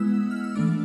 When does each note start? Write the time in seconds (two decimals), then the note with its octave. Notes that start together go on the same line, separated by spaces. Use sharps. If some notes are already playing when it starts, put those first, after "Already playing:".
Already playing: G#3 B3 E4 E6
0.31 F6
0.44 E6
0.55 E3 A3 D4 D6